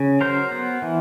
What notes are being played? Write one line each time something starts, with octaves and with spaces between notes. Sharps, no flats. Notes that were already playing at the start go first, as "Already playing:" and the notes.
Already playing: C#3
F#3 A#4 C5
B3
E3